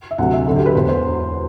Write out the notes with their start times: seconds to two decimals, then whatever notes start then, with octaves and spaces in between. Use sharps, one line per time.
0.11 E5
0.18 D2 C3 F#3 F#5
0.33 E5
0.47 D2 D3 F#3 A4
0.56 G4
0.66 B4
0.75 E1 E2 B2 C5
0.89 C5